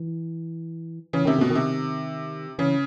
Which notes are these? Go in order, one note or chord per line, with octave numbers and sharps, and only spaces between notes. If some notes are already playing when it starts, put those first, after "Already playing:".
Already playing: E3
C#3 E3
C3 D#3
B2 D3
D#3
C3
C#3 E3